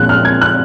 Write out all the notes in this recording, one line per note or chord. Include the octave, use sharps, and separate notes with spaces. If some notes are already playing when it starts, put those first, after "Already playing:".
Already playing: A#1 A#2 F3 G#3 F#6
F6
G#6
F#6